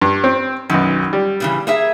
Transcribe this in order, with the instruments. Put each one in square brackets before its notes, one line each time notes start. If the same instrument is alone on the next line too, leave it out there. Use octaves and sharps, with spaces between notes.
[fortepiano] G2
C4
[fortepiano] B1 F#2 [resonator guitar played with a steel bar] D#3
[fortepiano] G3
[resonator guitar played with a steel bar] A#2 C#3 E3
A#3 G#4 E5